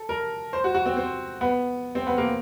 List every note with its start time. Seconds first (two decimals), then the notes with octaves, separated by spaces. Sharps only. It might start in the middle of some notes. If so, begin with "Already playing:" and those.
Already playing: A4
0.09 A#4
0.53 C5
0.64 F#4
0.75 F#4
0.86 C4
0.97 C4
1.41 B3
1.95 C4
2.07 B3
2.18 A#3